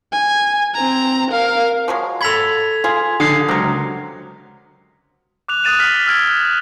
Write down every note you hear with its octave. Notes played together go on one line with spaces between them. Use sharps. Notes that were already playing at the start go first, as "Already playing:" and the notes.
G#5
C4 A#5
A#4 F5
F3 F#3 G#3
A4 B5 G#6 B6 F7
F4 G#4
D3 F5 D#6
C#2 C3 F#3 A#4
D6 F#6 F7
D#6 F#6 A6 D#7 E7
F6 B6 F#7
E6 F6 G#6 D7 D#7